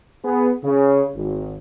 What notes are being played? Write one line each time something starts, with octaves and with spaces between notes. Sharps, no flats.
B3 G#4
C#3
G#1